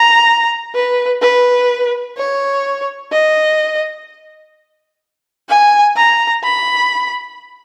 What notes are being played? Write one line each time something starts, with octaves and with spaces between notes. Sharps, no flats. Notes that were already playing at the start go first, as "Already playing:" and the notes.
Already playing: A#5
B4
B4
C#5
D#5
G#5
A#5
B5